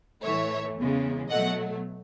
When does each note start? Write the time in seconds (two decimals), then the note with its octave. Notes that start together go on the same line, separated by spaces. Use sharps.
0.24 A2 E3 A3 C#5 E5
0.77 E2 C#3 G#3
1.30 B2 F#3 A3 D#5 F#5